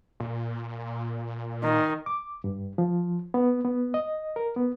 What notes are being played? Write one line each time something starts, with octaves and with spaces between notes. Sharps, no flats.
A#2
D#3
D6
G2
F3
B3
B3
D#5
A#4
B3